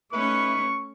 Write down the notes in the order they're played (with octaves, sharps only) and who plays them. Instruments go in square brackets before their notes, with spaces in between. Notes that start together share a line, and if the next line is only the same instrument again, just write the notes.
[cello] A3 C#4 [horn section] D#4 E4 B4 [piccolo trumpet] C#6